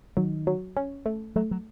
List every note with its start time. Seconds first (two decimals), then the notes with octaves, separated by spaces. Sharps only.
0.17 D#3 F#3
0.47 F#3
0.77 C#4
1.06 A3
1.36 F#3 A3
1.51 F#3